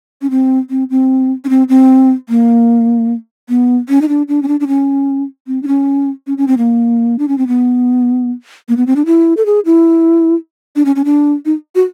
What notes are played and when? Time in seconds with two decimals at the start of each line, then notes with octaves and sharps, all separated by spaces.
0.22 C#4
0.30 C4
0.70 C4
0.90 C4
1.45 C#4
1.49 C4
1.69 C4
2.29 A#3
3.49 B3
3.89 C#4
4.02 D#4
4.09 D4
4.28 D4
4.43 C#4
4.48 D4
4.60 D4
4.68 C#4
5.47 C4
5.63 D4
5.68 C#4
6.27 C#4
6.38 C#4
6.48 C4
6.58 A#3
7.19 D4
7.28 C#4
7.38 C4
7.48 B3
8.69 A#3
8.77 B3
8.87 C4
8.96 D4
9.06 E4
9.37 A4
9.46 G#4
9.65 E4
10.76 D4
10.85 C#4
10.96 C#4
11.05 D4
11.45 D#4
11.75 F#4